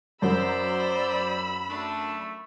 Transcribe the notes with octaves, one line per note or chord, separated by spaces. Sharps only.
F#2 F#3 C5 D5 B5 E6
A3 D4